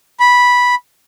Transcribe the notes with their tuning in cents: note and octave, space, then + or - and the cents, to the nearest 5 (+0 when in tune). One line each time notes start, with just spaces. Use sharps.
B5 -10